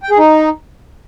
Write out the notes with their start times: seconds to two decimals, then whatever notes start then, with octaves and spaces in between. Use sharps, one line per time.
0.03 G5
0.10 G#4
0.18 D#4